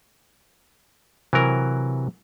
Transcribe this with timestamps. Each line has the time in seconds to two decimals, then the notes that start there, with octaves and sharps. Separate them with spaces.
1.33 C3 E3 F#3 A#4